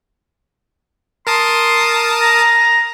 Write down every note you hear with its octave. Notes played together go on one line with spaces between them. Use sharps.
A#4 A5 C6 D#6
A#5